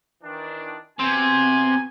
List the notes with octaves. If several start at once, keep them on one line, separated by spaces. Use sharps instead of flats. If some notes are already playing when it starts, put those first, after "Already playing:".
D#3 E3 D4
C3 B3 C4 F#4 G#5